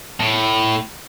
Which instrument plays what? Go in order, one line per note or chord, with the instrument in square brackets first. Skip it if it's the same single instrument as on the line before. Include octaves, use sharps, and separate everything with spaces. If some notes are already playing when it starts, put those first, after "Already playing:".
[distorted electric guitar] A2